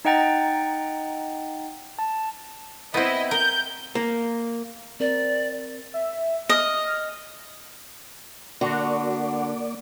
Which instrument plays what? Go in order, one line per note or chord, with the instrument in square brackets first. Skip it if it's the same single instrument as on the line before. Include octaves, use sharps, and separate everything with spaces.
[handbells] D#4 D#5 F#5 G5 A#5 A6
A5
[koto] B3 C4 [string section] E4 D#5
[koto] A#4 [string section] G6
[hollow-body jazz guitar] A#3
[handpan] C4 A#4 [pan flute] D5
[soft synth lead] E5
[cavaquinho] D#5 [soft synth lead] F6
[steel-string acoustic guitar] D3 [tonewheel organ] A#3 D5 [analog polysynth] F#4